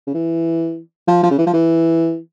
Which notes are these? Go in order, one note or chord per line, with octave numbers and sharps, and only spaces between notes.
C#3
E3
F3
F3
C#3
E3
F3
E3